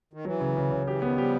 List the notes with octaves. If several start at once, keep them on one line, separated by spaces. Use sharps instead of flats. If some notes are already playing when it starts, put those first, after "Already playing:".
D#3
E3 F#3
C#3
C#3
C#3
E3 G4
F#3
D#3 F3 B3
F3 G3 G4